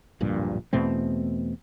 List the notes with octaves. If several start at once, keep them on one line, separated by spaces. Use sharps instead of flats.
D1 A#1 G2 A#2
E2 B2 A3 C4